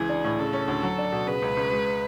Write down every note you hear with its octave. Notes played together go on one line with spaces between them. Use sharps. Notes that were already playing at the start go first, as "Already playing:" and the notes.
Already playing: C#2 E3 G#4
D4
A2
C#3 A4
C#4
D2
F#3
D4
B2
C#3 B4
C#2
C#2
G#3